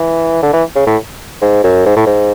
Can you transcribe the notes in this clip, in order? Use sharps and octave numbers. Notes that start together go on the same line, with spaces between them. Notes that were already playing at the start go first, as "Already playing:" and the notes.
Already playing: E3
D3
E3
C#3
A2
G#2
F#2
G#2
A2
G#2